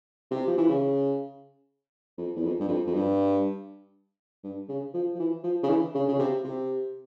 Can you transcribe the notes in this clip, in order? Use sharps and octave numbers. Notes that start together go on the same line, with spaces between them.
C3
F3
E3
C#3
F2
E2
F2
G2
F2
F2
G2
G2
C#3
F3
F3
E3
F3
C#3
E3
C#3
C#3
C3
C3